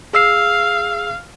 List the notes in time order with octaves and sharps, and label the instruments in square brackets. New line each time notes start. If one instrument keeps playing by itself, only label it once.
[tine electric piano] G#4 E6 C7 [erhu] F5